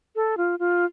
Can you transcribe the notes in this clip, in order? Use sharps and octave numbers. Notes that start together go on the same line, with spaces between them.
A4
F4
F4